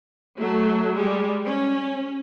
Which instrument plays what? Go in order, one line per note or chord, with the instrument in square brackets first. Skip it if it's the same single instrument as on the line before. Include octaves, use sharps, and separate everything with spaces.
[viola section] F#3 A3
G3 G#3
C#4